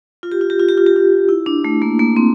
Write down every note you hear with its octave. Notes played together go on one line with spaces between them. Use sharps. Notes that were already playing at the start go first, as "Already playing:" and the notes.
F4
G4
F4
G4
F4
G4
F4
G4
F4
E4
D4
A3
A#3
A#3
C4